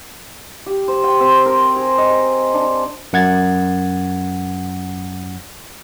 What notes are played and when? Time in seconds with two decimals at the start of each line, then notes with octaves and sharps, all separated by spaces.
0.66 G4
0.88 C5
1.04 G5
1.20 C4
1.46 A#4
1.76 G#4
1.98 D#5
2.54 D4
3.13 F#2 F#5 G#6 A6